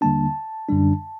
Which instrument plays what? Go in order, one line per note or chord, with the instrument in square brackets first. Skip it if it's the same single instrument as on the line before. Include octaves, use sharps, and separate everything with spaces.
[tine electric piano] D#2 D3 G3 A#3 D4 A5
F#2 D3 G3 D4